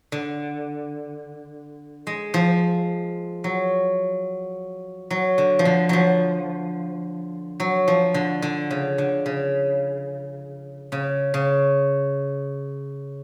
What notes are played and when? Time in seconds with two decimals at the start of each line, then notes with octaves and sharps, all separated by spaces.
0.12 D3
2.07 G#3
2.34 F3
3.44 F#3
5.11 F#3
5.38 D3
5.59 F3
5.65 D3
5.89 F3 F#3
7.60 F#3
7.88 F3
8.14 D3
8.42 D3
8.71 C#3
8.98 D3
9.26 C#3
10.92 C#3
11.34 C#3